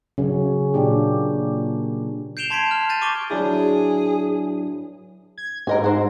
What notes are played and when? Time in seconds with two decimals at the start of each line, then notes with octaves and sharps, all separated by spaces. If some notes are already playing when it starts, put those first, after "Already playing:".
0.18 C#3 F#3 C#4
0.74 A#2 A#3 D4 G4
2.37 G6 C7 D7 E7 F7 G7
2.50 A5 C6 G#6 B6 C7 D7
2.71 F6
2.89 G6 A6 D#7
3.01 C#6 D6 D#7 G7
3.31 F#3 D4 E4 G#4
5.38 G#6
5.67 G#2 A#4 D#5 G#5
5.84 F#4 C5